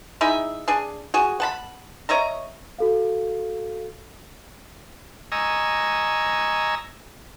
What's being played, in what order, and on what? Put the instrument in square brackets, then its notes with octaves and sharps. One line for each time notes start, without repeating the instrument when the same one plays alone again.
[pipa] D#4 E4 G#4 E5
D4 G#4
F#4 G#4
F#5 A5 B5
C#5 D#5 E5 A#5
[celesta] F#4 A4 F5
[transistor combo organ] D#5 G#5 A#5 C#6 E6